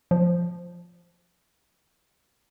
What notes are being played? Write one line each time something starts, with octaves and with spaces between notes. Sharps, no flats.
F3